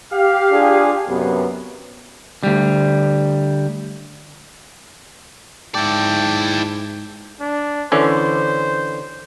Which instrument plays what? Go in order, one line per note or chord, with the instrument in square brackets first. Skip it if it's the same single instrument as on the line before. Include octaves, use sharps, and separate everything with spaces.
[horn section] G4 F5
[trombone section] D4 F4 G#4
F#2 C3 B3
[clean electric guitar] D2 G3
[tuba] G#2 [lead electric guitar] E4 D5 [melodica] G5 A5
[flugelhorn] D4
[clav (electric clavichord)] D3 E3 C#4 [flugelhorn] C5